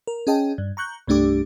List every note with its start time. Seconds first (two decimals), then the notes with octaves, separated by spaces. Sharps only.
0.07 A#4
0.27 C#4 G#4 D#5 G5 A5
0.58 G2
0.77 A#5 C#6 F#6 G6
1.07 C2 G2 A3 D4 G4 D6